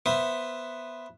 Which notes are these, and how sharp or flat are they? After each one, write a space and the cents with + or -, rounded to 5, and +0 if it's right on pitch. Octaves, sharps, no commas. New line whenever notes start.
B3 +0 C5 +0 E5 +10